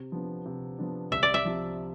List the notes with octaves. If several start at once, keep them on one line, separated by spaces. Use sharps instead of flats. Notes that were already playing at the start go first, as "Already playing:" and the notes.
Already playing: C3
F3 B3 D4
C3
F3 B3 D4
C2 E5
D5
E5
C3 F3